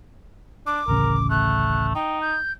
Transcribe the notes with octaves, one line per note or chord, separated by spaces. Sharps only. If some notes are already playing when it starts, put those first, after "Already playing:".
D4 D6
D1 A1 C#3 A#4
A3 F#6
D#4 G5
G6